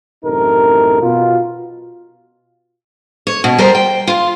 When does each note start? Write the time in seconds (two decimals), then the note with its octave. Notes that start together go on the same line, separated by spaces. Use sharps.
0.24 A1 F#2 C3 D#4 A4 A#4
1.03 B2 F4
3.27 C#5
3.44 B2
3.58 G3 A#4 C5
3.75 G5
4.07 F4